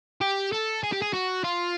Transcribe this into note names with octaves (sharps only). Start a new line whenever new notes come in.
G4
A4
G#4
G4
G#4
F#4
F4